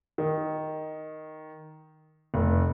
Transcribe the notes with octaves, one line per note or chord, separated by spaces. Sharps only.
D#3
F1